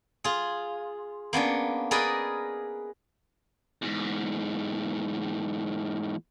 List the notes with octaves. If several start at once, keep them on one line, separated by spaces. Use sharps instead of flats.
F4 G#4
A#3 B3 C#4 D4
G#4 A#4 B4 D5 D#5
E2 G#2